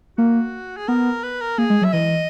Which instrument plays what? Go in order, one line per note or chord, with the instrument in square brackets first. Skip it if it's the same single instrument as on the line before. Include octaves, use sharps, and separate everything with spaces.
[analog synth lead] A#3 [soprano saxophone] F#4
[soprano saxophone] G#4
[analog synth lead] B3 [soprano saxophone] A#4
[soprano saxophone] B4
A#4
[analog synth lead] A#3 [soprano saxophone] G#4
[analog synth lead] G#3
F#3
[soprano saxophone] E5
[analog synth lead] E3 [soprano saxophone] D#5